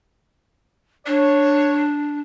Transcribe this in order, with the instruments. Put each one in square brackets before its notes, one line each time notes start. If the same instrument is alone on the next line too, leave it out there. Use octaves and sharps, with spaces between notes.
[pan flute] D4 [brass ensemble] C#5